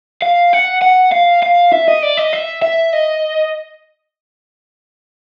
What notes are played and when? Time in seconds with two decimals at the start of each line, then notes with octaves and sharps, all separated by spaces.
0.22 F5
0.53 F#5
0.82 F#5
1.12 F5
1.43 F5
1.72 E5
1.87 D#5
2.02 D5
2.17 D#5
2.33 E5
2.62 E5
2.93 D#5